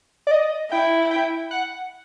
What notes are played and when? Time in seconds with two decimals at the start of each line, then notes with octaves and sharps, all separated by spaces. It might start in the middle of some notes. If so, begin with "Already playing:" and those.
0.27 D5
0.31 D#5
0.71 E4 G5
1.11 G5
1.51 F#5